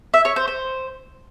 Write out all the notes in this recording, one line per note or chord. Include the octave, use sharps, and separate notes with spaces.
E5
C#5
C5
C5